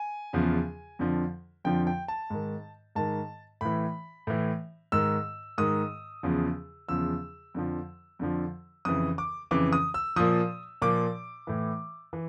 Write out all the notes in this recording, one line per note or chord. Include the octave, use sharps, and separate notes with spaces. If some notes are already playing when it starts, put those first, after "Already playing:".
Already playing: G#5
E2 C#3 F3
F2 D3 F3
F2 D3 F3 G5
G5
A5
G#2 D#3
G#2 D#3 A5
A2 E3 B5
A2 E3
G#2 D#3 E6
G#2 D#3 D#6
E2 C#3 F3
E2 C#3 F3 E6
F2 D3 F3
F2 D3 F3
F2 C#3 E3 D#6
D6
F2 C#3 E3 D6
D#6
E6
A#2 F3 D#6
A#2 F3 D6
A2 E3
E3